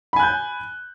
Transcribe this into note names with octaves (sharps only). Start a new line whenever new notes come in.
G#5 B5 F#6 G6